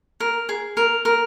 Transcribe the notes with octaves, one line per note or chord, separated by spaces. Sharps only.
A#4
G#4
A#4
A#4